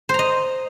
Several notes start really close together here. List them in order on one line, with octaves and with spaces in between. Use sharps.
C5 A#5 D#5